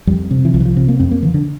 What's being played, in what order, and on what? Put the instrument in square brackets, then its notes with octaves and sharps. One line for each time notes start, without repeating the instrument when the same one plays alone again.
[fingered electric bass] F2 G3
C3
E3
C2 F3
E3
F3
C3
A#3
F2 C4
A#3
D3 E3
D3